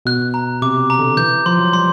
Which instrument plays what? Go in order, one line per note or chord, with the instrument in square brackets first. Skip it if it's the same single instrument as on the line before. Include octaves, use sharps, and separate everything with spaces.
[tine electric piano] B2 [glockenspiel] F#6
[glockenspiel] A#5
[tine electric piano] C3 [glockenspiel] D6
[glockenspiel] A#5
[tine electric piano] D3
[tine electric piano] E3 [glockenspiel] G6
[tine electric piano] F3 [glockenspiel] C6
[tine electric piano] F#3
[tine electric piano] G3 [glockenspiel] C6